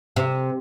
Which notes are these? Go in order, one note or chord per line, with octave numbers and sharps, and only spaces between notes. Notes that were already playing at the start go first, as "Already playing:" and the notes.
C3